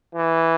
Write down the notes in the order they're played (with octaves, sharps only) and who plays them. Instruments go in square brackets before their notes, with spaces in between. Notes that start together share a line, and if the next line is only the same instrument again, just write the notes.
[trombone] E3